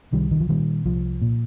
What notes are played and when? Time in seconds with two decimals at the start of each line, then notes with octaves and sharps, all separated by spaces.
0.12 C2 D#3 G3
0.31 D#3
0.40 F3
0.49 A#2 D#3 G3
0.85 C2 F3
1.22 A#2